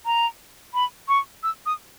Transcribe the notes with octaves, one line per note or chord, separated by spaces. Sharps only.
A#5
B5
C#6
E6
D#6